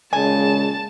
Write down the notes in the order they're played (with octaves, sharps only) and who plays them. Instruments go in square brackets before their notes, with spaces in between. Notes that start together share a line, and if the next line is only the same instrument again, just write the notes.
[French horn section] A#2 C#3 G#3 [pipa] G#5 [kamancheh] A5